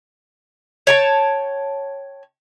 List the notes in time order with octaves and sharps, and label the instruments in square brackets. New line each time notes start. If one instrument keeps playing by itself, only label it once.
[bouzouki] C#5 G5 A5